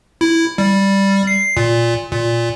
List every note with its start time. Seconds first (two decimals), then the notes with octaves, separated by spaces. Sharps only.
0.21 E4
0.58 G3
1.27 C7
1.57 A#2
2.12 A#2